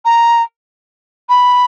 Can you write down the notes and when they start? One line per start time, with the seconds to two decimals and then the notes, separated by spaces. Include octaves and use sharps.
0.05 A#5
1.29 B5